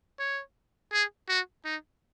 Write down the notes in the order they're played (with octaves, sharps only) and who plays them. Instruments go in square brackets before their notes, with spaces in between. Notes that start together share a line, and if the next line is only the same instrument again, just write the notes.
[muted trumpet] C#5
G#4
F#4
D#4